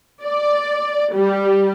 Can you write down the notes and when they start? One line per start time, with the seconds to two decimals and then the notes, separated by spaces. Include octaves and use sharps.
0.23 D5
1.14 G3